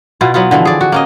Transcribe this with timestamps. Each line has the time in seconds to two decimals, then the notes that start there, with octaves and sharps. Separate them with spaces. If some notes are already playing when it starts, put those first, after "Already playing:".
0.21 B2 E4 F4
0.34 F#3 B3 E4 F4
0.51 D3 E3 F3 C4
0.65 G#4 D5
0.81 F#4
0.92 A#3 C#4 D#5